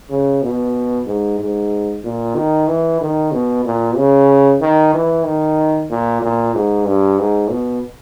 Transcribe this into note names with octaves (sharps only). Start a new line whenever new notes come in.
C#3
B2
G#2
G#2
A#2
D#3
E3
D#3
B2
A#2
C#3
D#3
E3
D#3
A#2
A#2
G#2
G2
G#2
B2